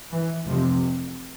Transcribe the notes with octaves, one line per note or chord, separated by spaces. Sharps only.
E3
F1 F2 C3 F3